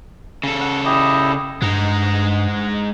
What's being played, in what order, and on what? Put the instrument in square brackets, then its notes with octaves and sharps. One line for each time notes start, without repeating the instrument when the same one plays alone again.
[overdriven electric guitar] C#3 A4
[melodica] F#5
E4 G4 D#5
[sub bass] G2 [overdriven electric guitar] G#3 D#4 [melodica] F#5